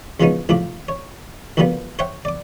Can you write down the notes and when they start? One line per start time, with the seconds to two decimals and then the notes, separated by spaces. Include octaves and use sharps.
0.20 E2 F3 G#3 B3 C#4 D#4
0.49 C2 A2 F3 D6
0.88 C#5
1.57 D2 A#2 D3 F3 G3 B3
1.99 C5 C#5 E5 F#5 G5
2.25 D5 D6